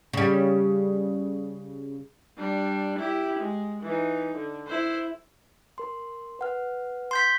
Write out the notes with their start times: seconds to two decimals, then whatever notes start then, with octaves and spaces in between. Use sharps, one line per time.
0.13 C#3 G3
2.37 G3 D4
2.98 E4 G4
3.40 G#3
3.83 E3 D#4
4.34 D3
4.67 E4 C5
5.78 A#4 C6
6.39 B4 F#5 F6
7.11 C6 G6 B6